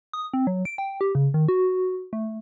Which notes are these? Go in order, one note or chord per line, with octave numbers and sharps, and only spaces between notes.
D#6
C4
F#3
D7
G5
G4
C#3
D#3
F#4
A3